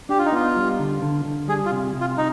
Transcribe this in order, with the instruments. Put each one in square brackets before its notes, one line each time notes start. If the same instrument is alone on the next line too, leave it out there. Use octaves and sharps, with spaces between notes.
[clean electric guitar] D4 [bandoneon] G4
[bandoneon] F4
D#4
[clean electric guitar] B3 [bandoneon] F4
[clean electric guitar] G3
D3
D3
D3
[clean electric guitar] G3 [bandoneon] G#4
[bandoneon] F4
[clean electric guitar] C3
C3
[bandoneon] F4
D#4